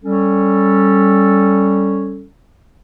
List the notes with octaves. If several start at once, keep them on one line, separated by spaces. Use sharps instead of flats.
G3 C#4 A4